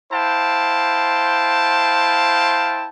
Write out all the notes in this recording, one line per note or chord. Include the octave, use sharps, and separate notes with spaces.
E4 C5 F5 G5 A5